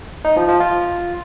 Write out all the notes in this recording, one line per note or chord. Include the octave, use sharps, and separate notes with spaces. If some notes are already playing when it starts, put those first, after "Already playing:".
D#4
F3
F3
F4